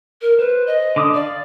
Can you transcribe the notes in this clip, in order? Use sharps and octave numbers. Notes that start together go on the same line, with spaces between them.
A#4
B4 C5
D#5
D3 D6 D#6
D5 F5